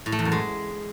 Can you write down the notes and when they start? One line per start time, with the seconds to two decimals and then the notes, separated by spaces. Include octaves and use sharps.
0.06 A2
0.12 A3
0.19 E2
0.25 F#2
0.32 G#3